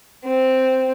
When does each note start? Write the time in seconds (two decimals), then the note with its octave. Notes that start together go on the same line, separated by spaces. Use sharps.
0.24 C4